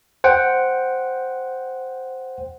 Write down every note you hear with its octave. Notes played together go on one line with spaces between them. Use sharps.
C5 F#5 G5